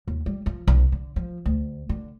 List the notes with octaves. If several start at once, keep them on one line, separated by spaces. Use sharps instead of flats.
D#2
G3
F3
B1
D3
F3
D2
D3